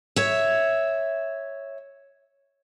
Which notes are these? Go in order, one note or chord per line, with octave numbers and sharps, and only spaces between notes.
C#5 E5